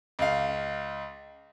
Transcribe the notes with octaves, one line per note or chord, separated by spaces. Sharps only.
C#2 F5